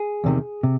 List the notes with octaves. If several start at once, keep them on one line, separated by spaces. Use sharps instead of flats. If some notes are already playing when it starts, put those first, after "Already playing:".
Already playing: G#4
E2 C3 D#3
C3